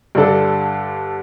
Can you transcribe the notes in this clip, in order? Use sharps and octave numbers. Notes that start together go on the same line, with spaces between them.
G2 D3 G3 D4 A4